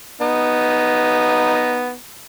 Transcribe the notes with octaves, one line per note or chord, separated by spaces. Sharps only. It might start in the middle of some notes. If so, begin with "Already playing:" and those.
B3 D#4